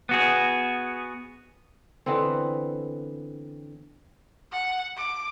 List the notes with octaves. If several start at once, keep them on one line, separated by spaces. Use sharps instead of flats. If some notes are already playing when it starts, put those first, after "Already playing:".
B3 F#4 G#4
D3 E3 B3 C4
F#5
D6